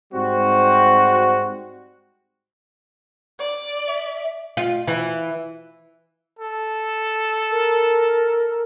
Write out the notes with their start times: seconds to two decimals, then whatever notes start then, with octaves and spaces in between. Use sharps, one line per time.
0.13 G#2 G3 C4 F#4
3.39 D5
3.87 E5
4.57 F4
4.87 E3
6.39 A4
7.51 A#4